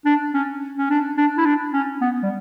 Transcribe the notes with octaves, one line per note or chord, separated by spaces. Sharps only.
D4
C#4
C#4
D4
D4
E4
D4
C#4
B3
G3